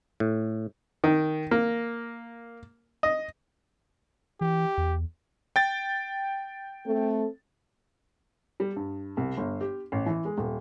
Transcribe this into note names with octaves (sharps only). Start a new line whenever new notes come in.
A2
D#3
A#3
D#5
E3 G4
E2
G5 A6
A3 C4 A4
G3
G2
C2
G1
G4
A1
E3
G#3
D#1